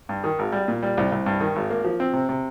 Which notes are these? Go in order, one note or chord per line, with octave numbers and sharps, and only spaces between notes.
G2
D#3
G#1
G3
A#2
G3
C2
C2
G2
D#3
G#1
A#3
F3
C4
C3
C3